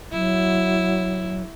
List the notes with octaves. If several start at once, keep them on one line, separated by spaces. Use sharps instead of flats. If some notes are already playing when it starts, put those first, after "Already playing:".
F#3 E4